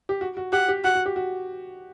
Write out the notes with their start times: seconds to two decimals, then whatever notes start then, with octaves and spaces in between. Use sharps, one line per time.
0.09 G4
0.21 F#4
0.37 F#4
0.53 G4 F#5
0.69 G4
0.84 F#4 F#5
0.95 F#4
1.06 G4
1.16 F#4